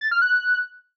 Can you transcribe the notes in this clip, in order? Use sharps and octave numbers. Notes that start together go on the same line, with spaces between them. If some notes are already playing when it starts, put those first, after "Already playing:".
A6
F6
F#6